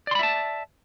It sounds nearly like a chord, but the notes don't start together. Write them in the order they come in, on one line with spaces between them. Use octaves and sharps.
D5 C6 B5 E5 A5